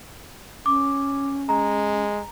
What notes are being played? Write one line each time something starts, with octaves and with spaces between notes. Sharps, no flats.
C#4 D6
G#3 A#5